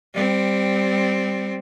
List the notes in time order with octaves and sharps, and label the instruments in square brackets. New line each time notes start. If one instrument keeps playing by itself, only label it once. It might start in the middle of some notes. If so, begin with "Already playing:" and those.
[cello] G3 C4